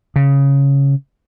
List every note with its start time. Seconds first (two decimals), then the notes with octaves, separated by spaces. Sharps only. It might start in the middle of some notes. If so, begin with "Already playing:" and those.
0.16 C#3